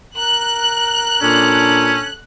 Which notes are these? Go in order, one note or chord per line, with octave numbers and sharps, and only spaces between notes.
A#4 F#6
A#2 C#4 D4 A4